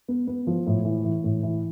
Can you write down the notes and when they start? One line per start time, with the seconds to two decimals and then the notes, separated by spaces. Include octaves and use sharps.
0.08 B3
0.27 B3
0.47 F3
0.67 A2
0.85 E3
1.04 E3
1.24 A2
1.43 E3